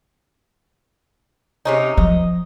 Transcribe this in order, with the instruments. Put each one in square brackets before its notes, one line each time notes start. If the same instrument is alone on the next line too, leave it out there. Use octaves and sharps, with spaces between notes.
[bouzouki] C3 C#4 D#4
[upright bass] F3 G#3 [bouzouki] D#5